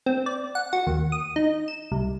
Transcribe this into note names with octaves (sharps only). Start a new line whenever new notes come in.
C4
D5
F#5
F#4
D#2
D#6
D#4
E7
C2